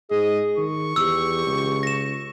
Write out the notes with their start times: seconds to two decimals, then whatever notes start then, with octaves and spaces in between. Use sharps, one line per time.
0.11 G#2 G#4 D#5
0.58 D#3 C#6
0.96 E2 G4 E6
1.47 C#2
1.83 A#6 E7